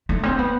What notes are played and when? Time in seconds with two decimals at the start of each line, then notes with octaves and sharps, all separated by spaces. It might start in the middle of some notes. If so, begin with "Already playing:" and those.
0.09 A3
0.23 C4
0.39 B3